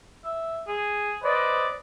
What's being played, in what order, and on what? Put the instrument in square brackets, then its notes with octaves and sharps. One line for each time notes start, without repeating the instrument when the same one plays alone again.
[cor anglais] E5
G#4
[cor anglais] B4 [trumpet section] C5 D5 D#5